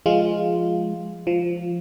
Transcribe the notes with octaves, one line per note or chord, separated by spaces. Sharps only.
F3 G#3 F4
F3